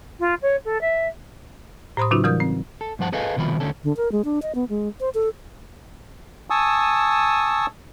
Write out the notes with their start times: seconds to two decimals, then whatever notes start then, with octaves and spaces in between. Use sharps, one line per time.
0.20 F4
0.42 C#5
0.65 A4
0.81 E5
1.97 A2 C5 B5 C6 D#6
2.11 C#3 F#3 C#4 D#4 F4 F#4
2.24 E3 G3 A#4 D#6 G6
2.40 C4
2.81 A4
2.99 G2 F3 C5 F#5 A5
3.12 G#4 A4 B4 D#5 F5 G#5
3.36 C2 B2 D#3 F3 B5
3.60 D2 D3 C#4 A4
3.84 D3
3.97 A#4
4.12 G#3
4.25 D4
4.42 D#5
4.55 B3
4.69 G#3
5.01 C5
5.15 A4
6.50 G#5 A5 C#6 D#6 E6